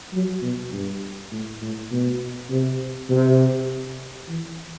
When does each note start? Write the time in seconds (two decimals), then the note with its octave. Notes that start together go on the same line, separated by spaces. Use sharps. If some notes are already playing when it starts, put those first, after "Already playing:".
0.13 F#3
0.42 B2
0.72 G2
1.31 A2
1.61 A2
1.91 B2
2.50 C3
3.10 C3
4.28 E3